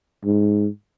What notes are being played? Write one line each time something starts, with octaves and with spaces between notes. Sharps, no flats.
G#2